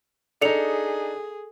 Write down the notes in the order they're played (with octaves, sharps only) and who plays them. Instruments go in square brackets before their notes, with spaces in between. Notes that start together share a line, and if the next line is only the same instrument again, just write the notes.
[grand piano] D4 D#4 [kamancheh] G#4 [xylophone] A4 C#7 F7